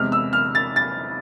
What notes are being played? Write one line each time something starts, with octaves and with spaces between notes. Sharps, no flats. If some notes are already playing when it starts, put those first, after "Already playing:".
Already playing: E2 C3 G#3 F6
E6
F6
A6
A6